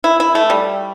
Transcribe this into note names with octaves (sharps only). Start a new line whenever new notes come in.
E4
E4
A3
G3